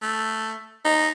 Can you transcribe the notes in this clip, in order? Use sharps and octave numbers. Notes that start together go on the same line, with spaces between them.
A3
D#4